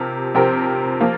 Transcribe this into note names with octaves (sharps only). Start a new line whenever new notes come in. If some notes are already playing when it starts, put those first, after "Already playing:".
Already playing: C3 F3 C4 G4 A#4
C3 F3 C4 G4 A#4
F3 A#3 F4